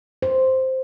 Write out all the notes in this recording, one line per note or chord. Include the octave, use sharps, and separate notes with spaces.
C5